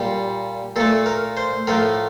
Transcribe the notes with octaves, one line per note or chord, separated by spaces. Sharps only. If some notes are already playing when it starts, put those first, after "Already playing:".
Already playing: A#2 G3
A#2 A3 A4
A#4
C5
A2 F3 A3 A#4